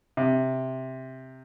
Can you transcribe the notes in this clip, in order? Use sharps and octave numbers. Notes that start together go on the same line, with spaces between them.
C3